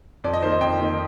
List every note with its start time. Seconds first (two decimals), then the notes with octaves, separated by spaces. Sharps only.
0.24 F2 D5
0.33 D#5
0.42 D#3 C5
0.45 A#3
0.52 D#5
0.61 F2 G5
0.79 D#3 A#3